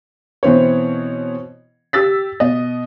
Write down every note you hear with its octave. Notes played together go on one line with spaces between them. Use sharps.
B2 E3 C4 C#5
G4 E6 A6 B6
B2 D#5